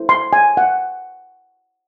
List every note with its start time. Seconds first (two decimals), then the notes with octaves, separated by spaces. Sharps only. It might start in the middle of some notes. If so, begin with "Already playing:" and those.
Already playing: E4 A4 C5
0.09 C6
0.33 G#5
0.57 F#5